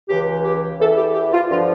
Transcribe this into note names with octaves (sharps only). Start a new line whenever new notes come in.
C#2 C#3 E3 G4
G4
E2 E3 A4
G4
G4
F4
G2 D3 F3 F4